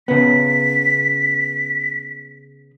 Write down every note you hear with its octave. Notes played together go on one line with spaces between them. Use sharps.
C#3 B3 B6